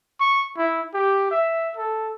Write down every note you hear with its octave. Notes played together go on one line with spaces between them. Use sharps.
C#6
E4
G4
E5
A4